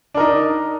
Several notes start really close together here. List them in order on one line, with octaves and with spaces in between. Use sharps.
D4 A#4 D#4